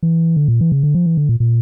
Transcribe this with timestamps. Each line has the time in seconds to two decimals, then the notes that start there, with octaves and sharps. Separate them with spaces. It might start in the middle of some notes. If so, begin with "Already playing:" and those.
0.03 E3
0.37 D3
0.48 A#2
0.61 E3
0.72 C#3
0.83 D3
0.94 F3
1.06 E3
1.17 D3
1.29 A#2
1.40 A#2